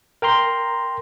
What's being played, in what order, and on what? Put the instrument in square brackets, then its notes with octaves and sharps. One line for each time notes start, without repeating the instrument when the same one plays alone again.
[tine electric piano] A#4 G5 A#5 C6